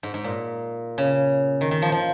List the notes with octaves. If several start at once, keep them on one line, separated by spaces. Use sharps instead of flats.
G#2
G#2
A#2
C#3
D#3
D#3
F3
F3